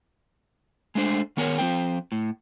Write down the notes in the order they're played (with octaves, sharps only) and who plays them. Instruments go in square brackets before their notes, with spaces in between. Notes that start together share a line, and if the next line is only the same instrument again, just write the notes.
[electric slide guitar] G#3 A3 D4 C5
D#3 B3 G#4 A#4 B4 C#5
F3 C4 C5 G5
A2